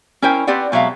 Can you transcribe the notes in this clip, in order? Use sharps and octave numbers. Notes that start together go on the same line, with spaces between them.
C#4 E4 A#4 C5 G5
C4 G4 B4 D5 F#5
B2 F#3 G#3 E5 F5